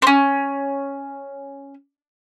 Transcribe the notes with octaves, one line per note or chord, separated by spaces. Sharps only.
C4 C#4